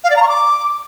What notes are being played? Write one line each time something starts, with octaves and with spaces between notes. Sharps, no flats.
F5
D5
A#5
C#6
D6